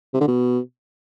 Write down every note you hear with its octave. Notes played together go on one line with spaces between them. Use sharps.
C3
D3
B2